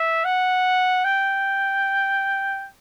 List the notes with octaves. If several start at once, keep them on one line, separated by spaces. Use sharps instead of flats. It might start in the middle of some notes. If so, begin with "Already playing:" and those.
Already playing: E5
F#5
G5